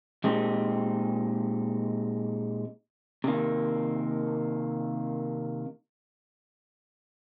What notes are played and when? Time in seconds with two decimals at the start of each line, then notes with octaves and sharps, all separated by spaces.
0.24 A#2 G#3 C4 D#4 G4
3.24 C3 D#3 A#3